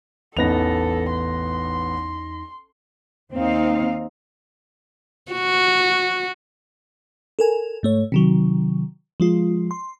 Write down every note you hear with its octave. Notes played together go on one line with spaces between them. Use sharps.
A1 E2 B3 D#4 A4 A#6 F7
C6
D#2 C4 D#4 F5
F#4
A4 A#4 G#5
G#2 A3 C#5
C3 D#3 F#3
F3 G#3 F4
C6